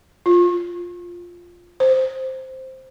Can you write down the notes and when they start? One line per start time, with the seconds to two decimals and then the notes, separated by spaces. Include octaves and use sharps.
0.26 F4
1.80 C5